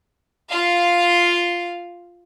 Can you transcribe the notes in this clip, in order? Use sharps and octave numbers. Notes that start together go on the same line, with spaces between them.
F4 F5